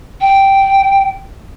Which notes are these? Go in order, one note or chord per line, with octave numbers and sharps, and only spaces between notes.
G5